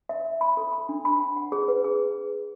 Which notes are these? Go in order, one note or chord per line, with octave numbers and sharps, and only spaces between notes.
E5
E5
B5
A4
B5
D4
B5
B5
F#5
G#4
B4
G#4